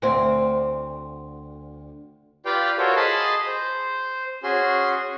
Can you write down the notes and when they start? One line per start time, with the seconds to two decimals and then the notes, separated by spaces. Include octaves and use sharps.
0.02 D2 C4
2.45 F4 G4 B4 D5 F5 G5
2.78 F4 F#4 A4 A#4 C5 C#5
2.96 G#4 D#5 A5 B5 C6
3.46 C5
4.43 C#4 F#4 G#4 C6